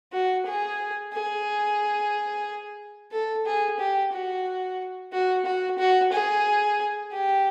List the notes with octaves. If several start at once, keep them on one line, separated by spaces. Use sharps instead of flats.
F#4
G#4
G#4
A4
G#4
G4
F#4
F#4
F#4
F#4
G#4
G4